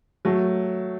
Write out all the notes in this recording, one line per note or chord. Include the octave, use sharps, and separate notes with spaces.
F#3 A3